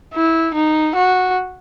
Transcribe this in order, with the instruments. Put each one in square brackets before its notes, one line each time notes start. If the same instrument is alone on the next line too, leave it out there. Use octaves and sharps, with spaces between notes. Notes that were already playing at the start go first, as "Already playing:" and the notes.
[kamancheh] E4
D#4
F#4